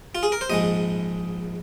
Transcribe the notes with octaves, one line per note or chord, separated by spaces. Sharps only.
F4
G#4
A#4
C5
A#1 G#2 G#3 D#5